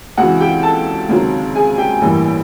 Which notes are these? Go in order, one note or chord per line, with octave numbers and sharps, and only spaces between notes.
C#2 C3 E3 F#4 F#5
G4 G5
A4 A5
C#2 C3 D#3 F#3
G#4 G#5
G4 G5
A1 G2 E3 G3 A#3